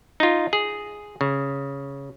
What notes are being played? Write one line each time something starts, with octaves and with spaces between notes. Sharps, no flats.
D#4 F4
G#4
C#3